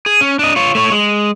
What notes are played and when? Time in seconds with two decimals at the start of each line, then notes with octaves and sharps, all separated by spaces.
0.06 G#4
0.21 C#4
0.39 D4 D#5
0.56 F4 C#5
0.75 A3 C#5
0.92 G#3